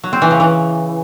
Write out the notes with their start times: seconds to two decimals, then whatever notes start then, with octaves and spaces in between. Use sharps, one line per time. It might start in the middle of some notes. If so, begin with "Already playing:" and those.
0.04 F#3
0.13 C4
0.22 E3
0.31 C#3
0.40 E3